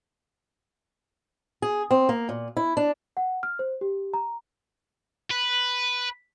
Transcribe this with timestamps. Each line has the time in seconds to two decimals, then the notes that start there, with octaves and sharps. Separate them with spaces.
1.62 G#4
1.91 C4
2.09 A#3
2.29 A#2
2.57 E4
2.77 D4
3.17 F#5
3.43 F6
3.59 C5
3.81 G4
4.14 A#5
5.31 B4